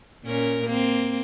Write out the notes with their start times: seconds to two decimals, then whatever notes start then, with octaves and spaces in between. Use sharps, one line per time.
0.25 A#2 C#4 A#4
0.66 A#3 C4